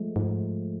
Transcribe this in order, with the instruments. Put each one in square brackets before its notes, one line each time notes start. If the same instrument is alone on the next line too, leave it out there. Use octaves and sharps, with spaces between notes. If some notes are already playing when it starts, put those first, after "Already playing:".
Already playing: [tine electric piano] F3 G#3 A3
[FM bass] G#2 [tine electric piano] F3